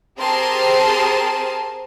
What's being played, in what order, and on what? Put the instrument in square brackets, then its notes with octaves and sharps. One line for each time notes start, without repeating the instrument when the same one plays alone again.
[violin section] C4 G4 G#4 A#4 A5 C6